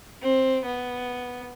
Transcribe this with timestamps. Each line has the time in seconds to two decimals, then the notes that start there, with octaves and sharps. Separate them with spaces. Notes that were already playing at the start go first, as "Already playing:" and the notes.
0.22 C4
0.65 B3